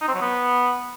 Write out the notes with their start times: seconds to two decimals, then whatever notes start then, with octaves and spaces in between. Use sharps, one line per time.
0.01 D#4
0.08 C4
0.15 F#3
0.21 B3